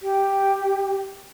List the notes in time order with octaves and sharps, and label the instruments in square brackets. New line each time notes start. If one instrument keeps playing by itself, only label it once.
[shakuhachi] G4